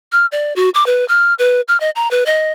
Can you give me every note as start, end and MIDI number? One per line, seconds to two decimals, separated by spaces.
0.12 0.26 89
0.32 0.54 74
0.56 0.70 66
0.74 0.86 86
0.86 1.07 71
1.08 1.34 89
1.39 1.61 71
1.68 1.79 89
1.80 1.90 75
1.96 2.10 82
2.11 2.24 71
2.26 2.52 75